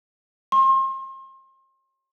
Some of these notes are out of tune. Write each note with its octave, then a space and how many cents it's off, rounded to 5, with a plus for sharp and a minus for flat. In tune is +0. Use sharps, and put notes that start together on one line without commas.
C6 +35